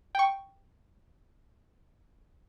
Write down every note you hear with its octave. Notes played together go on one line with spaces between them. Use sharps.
G5 C#6